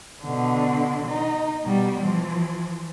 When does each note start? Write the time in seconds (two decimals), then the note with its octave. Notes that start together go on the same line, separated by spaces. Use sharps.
0.22 B2 D3
1.07 D#4
1.64 B2 G3
1.99 E3 F3